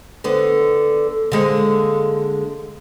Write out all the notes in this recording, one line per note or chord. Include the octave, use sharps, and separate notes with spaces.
D3 B3
D3 G#3 A#3